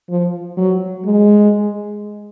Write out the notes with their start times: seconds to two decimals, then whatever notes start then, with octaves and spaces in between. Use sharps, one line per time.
0.09 F3
0.57 F#3
1.05 G#3